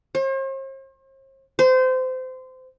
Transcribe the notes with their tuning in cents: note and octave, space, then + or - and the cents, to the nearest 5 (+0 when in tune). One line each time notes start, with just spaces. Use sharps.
C5 +45
C5 -25